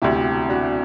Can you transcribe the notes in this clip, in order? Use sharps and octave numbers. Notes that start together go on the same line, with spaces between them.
E1 D2 C3 E4 G4
D4 F#4